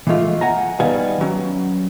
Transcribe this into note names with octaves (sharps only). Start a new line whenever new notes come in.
E3 F3 G#3 A3 F4
F#5 G#5 A#5
D#3 G3 B3 F5 G#5
F#3 C#4